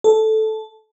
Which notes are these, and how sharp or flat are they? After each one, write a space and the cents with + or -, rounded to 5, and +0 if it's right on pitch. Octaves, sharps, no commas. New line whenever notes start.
A4 -10